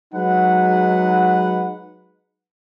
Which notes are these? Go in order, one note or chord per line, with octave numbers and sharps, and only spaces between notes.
F#3 G#3 D#4 B4 F#5